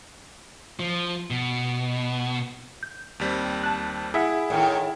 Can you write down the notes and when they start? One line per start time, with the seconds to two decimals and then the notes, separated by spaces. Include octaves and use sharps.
0.80 F3
1.30 B2
2.83 G6
3.20 D#2 G3 C4
3.64 A5 F#6
4.14 E4 G#4 E5 F#5
4.50 A2 D#3